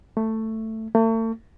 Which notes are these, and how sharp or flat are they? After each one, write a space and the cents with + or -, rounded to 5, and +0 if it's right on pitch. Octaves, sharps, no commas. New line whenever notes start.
A3 +10
A3 +40